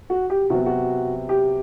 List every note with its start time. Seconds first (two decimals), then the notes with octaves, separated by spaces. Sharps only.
0.10 F#4
0.30 G4
0.50 C3 F#3 B3 F#4
0.66 F#4
1.29 G4